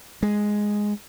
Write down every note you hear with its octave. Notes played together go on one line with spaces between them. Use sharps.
G#3